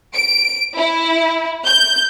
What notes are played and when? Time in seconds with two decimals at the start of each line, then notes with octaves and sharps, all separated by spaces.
0.15 D7
0.78 E4
1.66 G6